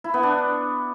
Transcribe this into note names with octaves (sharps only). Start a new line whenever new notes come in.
E4
B3
D4